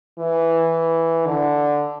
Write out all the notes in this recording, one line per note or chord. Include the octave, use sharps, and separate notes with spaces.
E3
D3